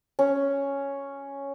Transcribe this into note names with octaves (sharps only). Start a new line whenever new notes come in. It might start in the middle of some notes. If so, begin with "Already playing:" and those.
C#4